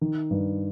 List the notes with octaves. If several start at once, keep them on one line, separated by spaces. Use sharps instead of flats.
D#3
G2